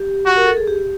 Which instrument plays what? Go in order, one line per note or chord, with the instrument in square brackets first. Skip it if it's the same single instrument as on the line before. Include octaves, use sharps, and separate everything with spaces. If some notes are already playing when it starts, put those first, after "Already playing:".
Already playing: [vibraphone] G4
[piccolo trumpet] F#4
[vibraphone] A#4
A4
G#4
G4